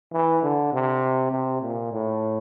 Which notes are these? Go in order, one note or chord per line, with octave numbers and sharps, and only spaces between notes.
E3
D3
C3
C3
A#2
A2